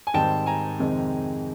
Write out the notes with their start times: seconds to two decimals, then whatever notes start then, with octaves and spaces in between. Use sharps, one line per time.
0.07 G#5
0.14 G#2 D#3 G3 C4 G5 A5
0.46 G#5 A#5
0.79 F2 C3 D#3 G#3 C4